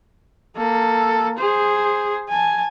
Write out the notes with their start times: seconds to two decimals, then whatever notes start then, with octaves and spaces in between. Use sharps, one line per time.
0.57 A#3 A4
1.38 G#4 C5
2.29 G#5 A5